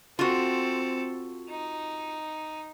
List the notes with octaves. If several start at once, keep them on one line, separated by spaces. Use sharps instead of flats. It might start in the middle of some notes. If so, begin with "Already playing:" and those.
C4 F4 F#4 A4
D#4